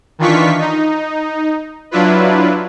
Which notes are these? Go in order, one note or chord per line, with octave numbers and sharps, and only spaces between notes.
D#3 E3 D4 F4 C#6 B6
D#4
F#3 D4 E4 F4 B4